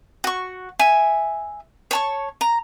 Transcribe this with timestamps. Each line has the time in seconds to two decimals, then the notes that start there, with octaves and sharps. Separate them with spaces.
0.24 F#4 C#6
0.79 E5 G#5
1.91 C#5 A5 C#6
2.41 A#5